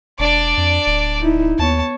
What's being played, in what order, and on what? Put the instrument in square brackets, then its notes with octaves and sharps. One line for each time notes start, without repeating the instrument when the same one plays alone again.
[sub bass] E1 [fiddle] D4 D5
[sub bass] F2
D1
[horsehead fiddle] D#4 E4
[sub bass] D#2 [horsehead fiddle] B3 C#5 [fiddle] A5